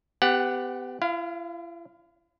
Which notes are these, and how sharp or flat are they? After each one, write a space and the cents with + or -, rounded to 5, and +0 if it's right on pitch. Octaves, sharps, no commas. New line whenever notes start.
B3 +35 G4 +5 F#5 +0
E4 +45 F5 +0